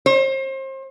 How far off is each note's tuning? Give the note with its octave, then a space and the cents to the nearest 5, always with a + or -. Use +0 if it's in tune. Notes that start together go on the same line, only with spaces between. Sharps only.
C5 +35